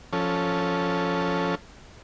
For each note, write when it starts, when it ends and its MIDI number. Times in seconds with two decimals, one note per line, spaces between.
0.13 1.55 53
0.13 1.55 61
0.13 1.55 69